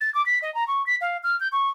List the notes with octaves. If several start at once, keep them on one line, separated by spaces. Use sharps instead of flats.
A6
D6
B6
D#5
A#5
C#6
B6
F5
F6
G6
C#6